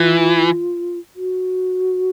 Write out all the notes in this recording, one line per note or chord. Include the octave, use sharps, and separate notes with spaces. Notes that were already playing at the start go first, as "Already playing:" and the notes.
Already playing: E3 F4
F#4